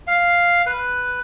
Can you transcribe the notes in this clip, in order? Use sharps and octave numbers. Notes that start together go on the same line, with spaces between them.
F5
B4